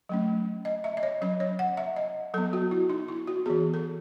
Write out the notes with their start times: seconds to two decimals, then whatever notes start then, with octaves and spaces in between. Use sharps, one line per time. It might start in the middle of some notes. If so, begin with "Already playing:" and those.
0.09 F#3 A3 C#4
0.65 D#5
0.84 E5
0.97 D#5
1.03 C#5
1.22 F#3 C#4 D#5
1.40 C#5
1.59 F#5
1.77 E5
1.96 D#5
2.34 F#3 A4
2.38 B3
2.53 F#4
2.71 E4
2.90 D#4
3.08 E4
3.27 F#4
3.46 E3 B3 G#4
3.74 A4